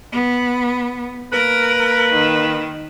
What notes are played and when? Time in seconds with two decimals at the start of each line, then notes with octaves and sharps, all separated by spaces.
0.13 B3
1.32 A#3 A#4 B4
2.13 D#3